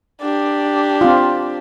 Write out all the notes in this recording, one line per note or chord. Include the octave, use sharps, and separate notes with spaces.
D4 G4
C4 F4